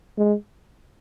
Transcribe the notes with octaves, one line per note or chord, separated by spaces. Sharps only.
G#3